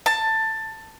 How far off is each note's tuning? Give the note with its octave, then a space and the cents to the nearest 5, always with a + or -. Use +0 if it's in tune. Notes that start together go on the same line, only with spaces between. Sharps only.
A5 +15